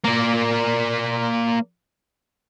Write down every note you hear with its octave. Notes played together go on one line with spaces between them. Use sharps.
A#3 D5